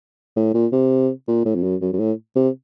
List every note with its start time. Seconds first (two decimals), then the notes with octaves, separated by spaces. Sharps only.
0.36 A2
0.54 A#2
0.72 C3
1.28 A#2
1.45 A2
1.55 F2
1.63 F#2
1.82 F#2
1.93 F#2
1.99 A2
2.36 C3